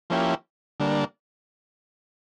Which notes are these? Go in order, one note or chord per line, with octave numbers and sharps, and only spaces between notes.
F3 A#3 C#4 E4 G4
D3 G3 A#3 D4